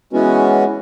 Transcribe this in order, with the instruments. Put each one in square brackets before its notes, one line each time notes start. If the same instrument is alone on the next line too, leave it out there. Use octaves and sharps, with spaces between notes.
[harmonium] E3 G#3 B3 C#4 F#4